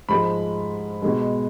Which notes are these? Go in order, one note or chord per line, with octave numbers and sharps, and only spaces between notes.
G#2 F3 G#3 B5
B2 G#3